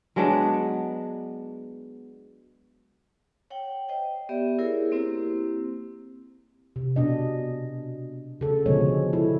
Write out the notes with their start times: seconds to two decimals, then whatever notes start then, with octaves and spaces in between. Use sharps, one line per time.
0.16 F#3 G#3 B3 D4
3.50 C#5 F#5 G5
3.89 C5 D#5 G5
4.29 B3 G4 D5 E5
4.58 E4 G#4 A#4 C#5
4.92 A#3 C4 E4 G4 C5
6.76 C3
6.96 B2 D4 D#5
8.41 C#3 A4
8.66 B2 D3 F3 G#3 C#5
9.13 E4 A4